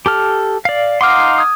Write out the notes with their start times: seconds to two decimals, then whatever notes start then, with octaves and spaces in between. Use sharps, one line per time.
0.06 G4 A4 F6
0.65 D5 F5
1.01 D#4 F5 F#5 C6 D6 F6
1.38 D#6 G#6